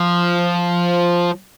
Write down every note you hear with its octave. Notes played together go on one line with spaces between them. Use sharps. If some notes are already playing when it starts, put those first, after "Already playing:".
Already playing: F3